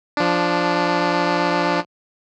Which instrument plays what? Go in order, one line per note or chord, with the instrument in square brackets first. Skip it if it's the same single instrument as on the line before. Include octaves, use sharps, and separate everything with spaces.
[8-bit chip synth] F3 D4